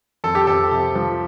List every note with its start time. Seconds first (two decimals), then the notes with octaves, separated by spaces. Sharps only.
0.24 F2 A4
0.35 G4
0.47 F2 A4
0.71 C3
0.95 F3